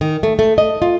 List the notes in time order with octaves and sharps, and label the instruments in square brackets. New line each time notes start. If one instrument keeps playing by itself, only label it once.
[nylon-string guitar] D#3
A3
A3
D#5
F4